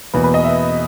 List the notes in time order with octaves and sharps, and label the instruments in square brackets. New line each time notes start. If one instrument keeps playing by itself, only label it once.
[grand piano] E2 B2 A#3 [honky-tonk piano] B4
[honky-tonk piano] B4
D#5
E5